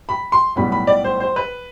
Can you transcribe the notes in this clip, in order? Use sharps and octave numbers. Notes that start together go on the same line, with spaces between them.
B5
C6
B1 A2 G3 B3 B5
B5
D5
C5
C5
B4